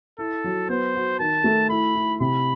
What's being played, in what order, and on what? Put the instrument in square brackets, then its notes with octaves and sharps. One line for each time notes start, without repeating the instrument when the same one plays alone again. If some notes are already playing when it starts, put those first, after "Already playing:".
[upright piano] E4 [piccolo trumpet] A4
[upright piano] F#3
[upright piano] B3 [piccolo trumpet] C5
[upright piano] F#4
[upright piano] D#3 [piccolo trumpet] A5
[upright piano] A3
[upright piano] E4 [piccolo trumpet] B5
[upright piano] E4
[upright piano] C3 [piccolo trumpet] B5